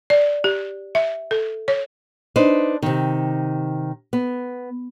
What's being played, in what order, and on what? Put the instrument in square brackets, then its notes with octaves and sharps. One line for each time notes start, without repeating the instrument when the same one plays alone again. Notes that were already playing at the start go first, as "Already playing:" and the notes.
[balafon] D5
G4
E5
A4
C#5
[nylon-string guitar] D4 D#4 B4 C5
C3 D#3
B3